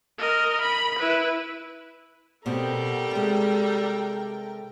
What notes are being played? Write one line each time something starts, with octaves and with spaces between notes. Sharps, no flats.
A#4 D#5
B5
E4 B4
B2 G3 C4 A4 A#4 G5
C3 G#3